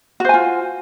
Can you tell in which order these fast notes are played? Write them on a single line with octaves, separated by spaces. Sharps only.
F#4 C5 G#5 F4